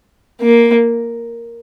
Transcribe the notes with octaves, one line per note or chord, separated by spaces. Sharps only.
A#3